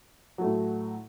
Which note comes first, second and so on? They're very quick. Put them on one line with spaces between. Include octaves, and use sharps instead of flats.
F#3 A3 A2